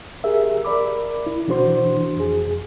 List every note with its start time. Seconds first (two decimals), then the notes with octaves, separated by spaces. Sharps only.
0.24 G4 G#4 A#4 E5
0.65 A#4 D5 B5 D6
1.26 E4
1.47 B2 E3 D4 F#4 C5 C6
2.16 F2 G#4